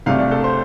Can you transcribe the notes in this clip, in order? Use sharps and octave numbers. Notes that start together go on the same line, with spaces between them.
C2 C3 A3 D4 F5
D5
A4
C5